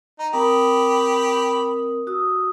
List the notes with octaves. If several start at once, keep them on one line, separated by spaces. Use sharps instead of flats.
D#4 A#5
C4 G4 A#4 B5 D#6
F#4 D#6 E6